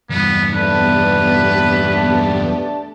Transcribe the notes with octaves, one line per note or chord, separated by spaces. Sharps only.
E2 G2 B3
A3 B3 D4 G4 B4 A5